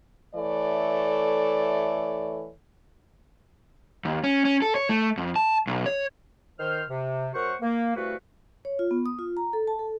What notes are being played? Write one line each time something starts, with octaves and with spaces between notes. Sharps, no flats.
E3 A3 A4 C#5 D5
D#2
C#4
C#4
A4
C#5
A3
F2
A5
B1
C#5
D#3 C5 F6
C3
F#2 A#4 C5 F#5 C#6
A#3
C2 A3 F#4 B4 F5 C#6
C#5
F4
B3
D#6
F4
A#5
A4
A5
A4